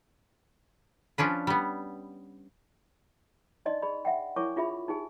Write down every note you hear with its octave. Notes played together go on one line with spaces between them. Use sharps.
F3 C#4 D4 B4
G3 B3
D4 D#4 D5 D#5 C6
G#4 D5 B5
E5 F#5 G5
E4 A#4 C#5 G#5 C#6 D6
D4 F4 G#4 E5 B5
D#4 G4 G#4 G#5